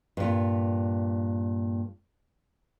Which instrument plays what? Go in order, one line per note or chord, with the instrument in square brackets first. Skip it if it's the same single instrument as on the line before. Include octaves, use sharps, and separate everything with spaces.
[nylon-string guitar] G2 A#2